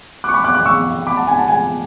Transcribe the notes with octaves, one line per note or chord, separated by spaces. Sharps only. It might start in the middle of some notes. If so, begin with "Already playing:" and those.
C#6 D6 F#6
B5 D6
D6 F#6
D6 F#6
C#6 E6
B5 D6
F#5 A5
G#5
F#5 A5
G#5